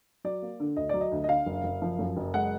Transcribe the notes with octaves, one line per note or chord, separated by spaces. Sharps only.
F#3 D5
A#3
D3
D2 D#5
F#3 D5
D#5
D2
D#5
D3 F5
F#1
F#1
F3
F#2
F#1
G#3 F#5